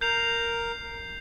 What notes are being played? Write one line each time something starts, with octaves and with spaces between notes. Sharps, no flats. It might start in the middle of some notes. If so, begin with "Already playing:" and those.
A#4 G6 C7 F7